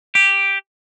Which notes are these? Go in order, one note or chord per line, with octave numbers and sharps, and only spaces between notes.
G4